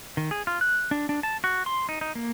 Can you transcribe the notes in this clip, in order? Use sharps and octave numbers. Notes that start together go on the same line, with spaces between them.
D#3
G#4
F4
F#6
D4
D4
A5
F#4
C6
D#4
D#4
A#3